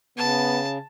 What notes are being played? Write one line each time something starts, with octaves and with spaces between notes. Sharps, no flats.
C#3 B3 A5